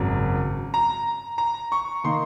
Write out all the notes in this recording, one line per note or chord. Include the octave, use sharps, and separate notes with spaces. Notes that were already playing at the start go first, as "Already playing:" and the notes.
Already playing: G#1 F#2 C#3
A#5
A#5
C#6
D#3 A#3 D#4 C6